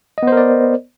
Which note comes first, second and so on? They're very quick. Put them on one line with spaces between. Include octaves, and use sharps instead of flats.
D#5 B3 C5 A#4 D5